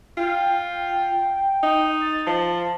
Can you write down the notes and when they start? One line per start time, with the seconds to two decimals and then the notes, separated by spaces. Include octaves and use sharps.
0.17 F4 G5
1.63 D#4
2.01 A6
2.27 F3 A5